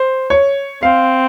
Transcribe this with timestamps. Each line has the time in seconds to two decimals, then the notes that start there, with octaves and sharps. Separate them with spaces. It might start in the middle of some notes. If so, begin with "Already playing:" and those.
Already playing: C5
0.30 C#5
0.82 C4 F5